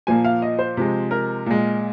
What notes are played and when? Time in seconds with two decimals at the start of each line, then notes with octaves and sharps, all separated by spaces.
0.07 A#2 F3 A#3 G#5
0.25 F5
0.42 D#5
0.59 C5
0.77 C3 F3 G#3
1.11 A#4
1.46 A#2 G#3